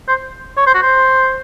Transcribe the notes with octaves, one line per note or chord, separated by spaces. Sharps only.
C5
C#5
C5
F#4
C5